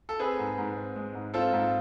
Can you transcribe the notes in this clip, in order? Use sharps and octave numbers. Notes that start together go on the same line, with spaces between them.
A4
C4 G#4 B4
G#2
G#2
C4
G#3
G#2
C4 F4 A4
G#2